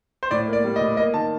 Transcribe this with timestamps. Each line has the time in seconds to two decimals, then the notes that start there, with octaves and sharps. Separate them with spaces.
0.23 C5
0.31 A2 D5
0.48 A#3 D5
0.64 G3
0.76 D#5
0.81 A2
0.97 A#3 D#5
1.14 D#3 A5